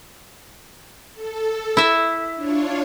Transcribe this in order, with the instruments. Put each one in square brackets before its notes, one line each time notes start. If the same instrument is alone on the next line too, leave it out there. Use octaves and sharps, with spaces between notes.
[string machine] A4
[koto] E4 E5
[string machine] D4 F4 C#5